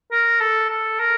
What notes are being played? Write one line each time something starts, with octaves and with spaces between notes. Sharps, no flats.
A#4
A4
A4
A#4